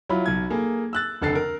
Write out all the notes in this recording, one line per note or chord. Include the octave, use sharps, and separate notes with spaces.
F#3 E4 F4 B5
B1 G#6
A#3 G#4 A4
E6 F#6 A6
F1 D3 A4 A6 C7
A#4